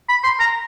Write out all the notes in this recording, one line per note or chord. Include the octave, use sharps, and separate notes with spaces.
B5
C6
A#5